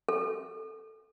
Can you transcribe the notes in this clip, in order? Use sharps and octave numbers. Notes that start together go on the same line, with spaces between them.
A4